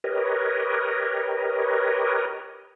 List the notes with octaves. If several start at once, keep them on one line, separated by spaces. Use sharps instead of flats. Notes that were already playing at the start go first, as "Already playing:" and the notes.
G4 A#4 B4 C#5 D#5